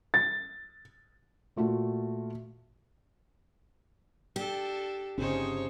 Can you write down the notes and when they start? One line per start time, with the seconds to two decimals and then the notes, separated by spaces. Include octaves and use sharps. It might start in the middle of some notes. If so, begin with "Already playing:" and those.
0.14 A6
1.56 A#2 A3 F4 F#4
4.36 D4 G4 A4
5.18 G1 C#3 C4 D4 D#4 G#4 C5 C#5